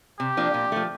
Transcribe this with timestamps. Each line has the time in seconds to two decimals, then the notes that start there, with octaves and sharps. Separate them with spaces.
0.19 C3 G4
0.37 F3 A#3 D4
0.54 A#2
0.72 F3 A3